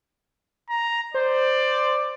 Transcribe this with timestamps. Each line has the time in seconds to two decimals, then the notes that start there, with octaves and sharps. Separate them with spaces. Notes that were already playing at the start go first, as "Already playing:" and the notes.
0.70 A#5
1.14 C5 D5